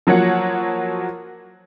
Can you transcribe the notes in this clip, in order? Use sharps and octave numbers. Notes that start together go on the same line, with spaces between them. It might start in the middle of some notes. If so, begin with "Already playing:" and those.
F3 F#3 A#3 C#5 F#5 C#7